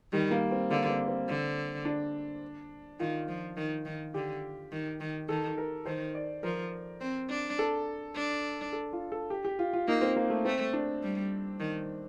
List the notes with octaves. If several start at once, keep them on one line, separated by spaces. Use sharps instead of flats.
D#3 G3
A#3
C4
D3 A#3
C4
C4
D3
D4
D#3 F4
F3
D#3
D#3
D3 G4
D#3
D#3
D#3 A4
A#4
D#3 C5
D5
F3 A#4
C4
D4
A4
D4
A4
F4
A4
G4
G4
F4
F4
A#3 D#4
C4
A#3
A3
A3 C4
D4
G3
D#3